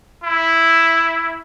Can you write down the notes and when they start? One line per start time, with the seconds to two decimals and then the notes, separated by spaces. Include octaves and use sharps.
0.24 E4